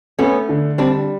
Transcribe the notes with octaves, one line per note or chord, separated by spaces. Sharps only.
A3 B3 C#4
D3
G3 C4 D4